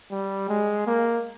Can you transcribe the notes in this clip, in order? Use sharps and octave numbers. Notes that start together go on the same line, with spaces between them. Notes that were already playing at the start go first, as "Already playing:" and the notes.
G3
G#3
A#3